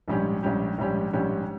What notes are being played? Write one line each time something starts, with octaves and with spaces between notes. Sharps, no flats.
A#1 G#2 G3 C#4 G4
A#1 G#2 G3 C#4 G4
A#1 G#2 G3 C#4 G4
A#1 G#2 G3 C#4 G4